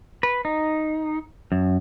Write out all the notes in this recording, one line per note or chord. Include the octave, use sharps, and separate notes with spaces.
B4
D#4
F#2